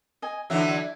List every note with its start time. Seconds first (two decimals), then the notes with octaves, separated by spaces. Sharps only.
0.22 D#5 G#5
0.50 D3 E3 F#3 E5